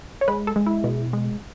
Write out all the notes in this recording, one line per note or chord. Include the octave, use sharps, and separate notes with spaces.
C#5
G#3 B4
A4
G#3
E4
B2
G#3